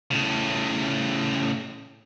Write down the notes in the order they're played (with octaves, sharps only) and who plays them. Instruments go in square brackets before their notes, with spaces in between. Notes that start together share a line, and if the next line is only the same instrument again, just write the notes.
[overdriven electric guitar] A2 C#3